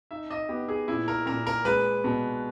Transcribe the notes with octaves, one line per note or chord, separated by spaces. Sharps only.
D#4 E5
D#5
B3 G4
G#4
A#2 E4
A#4
A#2 A#4
A#4
G#3 B4
B2